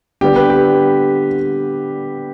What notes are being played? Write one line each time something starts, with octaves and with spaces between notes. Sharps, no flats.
D3 G3 B3 G4
B4
G4